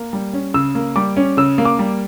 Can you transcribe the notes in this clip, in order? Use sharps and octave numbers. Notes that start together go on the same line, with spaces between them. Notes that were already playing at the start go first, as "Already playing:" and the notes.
Already playing: A#3
G3
C#4
C#3 E6
A#3
G3 D6
C#4
C#3 E6
A#3
D6
G3